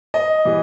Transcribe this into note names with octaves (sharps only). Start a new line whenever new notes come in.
D#5
E3 G3